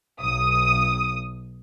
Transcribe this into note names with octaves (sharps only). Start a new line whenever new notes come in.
B1 D#6